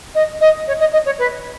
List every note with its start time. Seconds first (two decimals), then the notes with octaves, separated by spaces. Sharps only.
0.15 D#5
0.41 D#5
0.67 C#5
0.80 D#5
0.93 D#5
1.05 C#5
1.18 B4